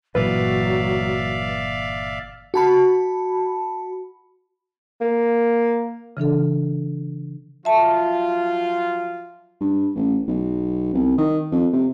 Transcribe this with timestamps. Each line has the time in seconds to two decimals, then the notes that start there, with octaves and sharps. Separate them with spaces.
0.15 G1 A#2 E3 F#3 B4 D5 E5 F5
2.54 F#4 A5 B5
5.01 A#3
6.17 C#3 E3 D4 A4
7.65 F3 F#3 F4 E5 A5
9.61 G2
9.95 A1
10.27 B1
10.94 C2
11.18 D#3
11.52 F2
11.73 C3